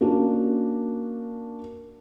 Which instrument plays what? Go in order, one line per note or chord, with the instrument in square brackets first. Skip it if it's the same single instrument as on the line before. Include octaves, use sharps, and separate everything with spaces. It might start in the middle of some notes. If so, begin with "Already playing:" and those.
[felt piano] A#3 C#4 D4 F#4